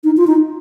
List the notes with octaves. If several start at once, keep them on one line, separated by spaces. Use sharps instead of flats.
D#4
F4
D#4